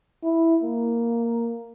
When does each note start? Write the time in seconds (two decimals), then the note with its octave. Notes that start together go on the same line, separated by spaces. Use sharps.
0.23 E4
0.63 A#3